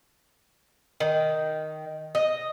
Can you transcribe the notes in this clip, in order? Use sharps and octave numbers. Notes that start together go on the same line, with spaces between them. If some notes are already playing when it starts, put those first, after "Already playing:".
D#3
D#5